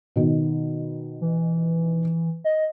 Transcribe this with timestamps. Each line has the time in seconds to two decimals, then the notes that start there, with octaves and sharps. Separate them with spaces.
0.16 B2 D#3
1.21 E3
2.44 D#5